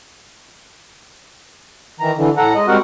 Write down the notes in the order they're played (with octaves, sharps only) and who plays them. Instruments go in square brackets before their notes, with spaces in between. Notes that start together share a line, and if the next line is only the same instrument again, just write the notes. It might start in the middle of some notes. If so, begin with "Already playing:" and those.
[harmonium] D#3 E3 A#5
D3 E3
A2 A4 F#5 A#5
G#3 D#5
G3 G#3 C4 F#4 A#4 F#5